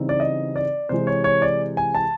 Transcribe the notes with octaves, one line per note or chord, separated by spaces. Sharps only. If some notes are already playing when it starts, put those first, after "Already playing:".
Already playing: C#3 E3 G3 C4 D#4
D5
D#5
D5
C3 E3 G#3 C5
C#5
C#5
D5
G#5
A5